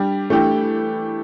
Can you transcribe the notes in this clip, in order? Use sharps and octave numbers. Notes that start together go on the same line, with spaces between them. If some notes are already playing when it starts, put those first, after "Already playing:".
Already playing: G3 D4 G4
E3 A3 D4 G4